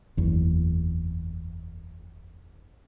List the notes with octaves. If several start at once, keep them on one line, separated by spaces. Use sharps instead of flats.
F#1 E2